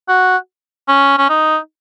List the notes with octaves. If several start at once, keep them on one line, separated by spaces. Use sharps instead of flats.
F#4
C#4
C#4
D#4